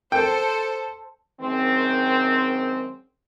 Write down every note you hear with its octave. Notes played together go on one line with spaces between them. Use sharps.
A4 C5 G5
F#2 D#3 G#3 C4